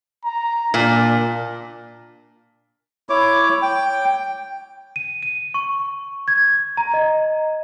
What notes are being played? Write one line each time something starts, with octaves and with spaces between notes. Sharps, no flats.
A#5
A#2 D4
E4 C#5 D6
G5
D#7
D#7
C#6
G#6
A#5
D#5